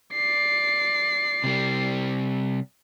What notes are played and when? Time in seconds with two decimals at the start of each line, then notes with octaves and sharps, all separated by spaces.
0.14 D5 C7
1.44 C3 G3